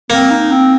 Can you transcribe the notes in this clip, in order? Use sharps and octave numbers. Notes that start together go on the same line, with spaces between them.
A#3 C4
D#4
C4